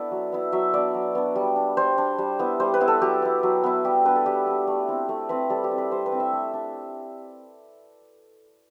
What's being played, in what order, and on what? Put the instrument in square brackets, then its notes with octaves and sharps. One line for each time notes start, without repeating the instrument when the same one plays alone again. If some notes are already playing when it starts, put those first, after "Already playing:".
Already playing: [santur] B3 D4 E4 A4 B4 D5
F#3
B3 E4
F#3 E5
B3 D4 D5
F#3
B3 D4
G3
D4
G3 C5
D4
G3
B3 E4
G3 C5
B4
B3 E4
A4
F#3 G4
B3 E4
F#3
B3 E4
G3 G4
B3 D4 B4
A4
G3 G4
B3 D4
A3
C4 E4
A3
C4 E4 B4
G3 A4
G4
C4 E4
B4
G3 C5
B4
C4 E4
E5
A3
D4